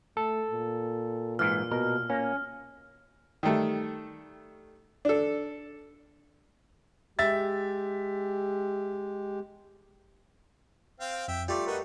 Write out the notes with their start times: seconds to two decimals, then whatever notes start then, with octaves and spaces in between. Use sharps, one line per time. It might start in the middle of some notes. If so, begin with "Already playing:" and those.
0.17 A3 A4
0.51 A#2
1.39 G#2 E3 F6
1.71 B2 A#4
2.10 A#3 C#4
3.43 D#3 G3 A3
5.05 D4 A4
7.19 G#3 G4 E5 A6
11.00 C4 F5 G5
11.28 F2 E5 G5
11.48 G3 A3 F4 D5 C6
11.67 D#4 F#4 A#4 B4 D#5